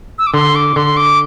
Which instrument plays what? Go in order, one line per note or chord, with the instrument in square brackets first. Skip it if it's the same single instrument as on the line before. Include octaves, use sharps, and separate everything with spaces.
[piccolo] E6
D6
[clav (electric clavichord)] D3 [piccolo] C6
[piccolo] D6
[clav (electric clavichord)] D3 [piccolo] C6
[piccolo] D6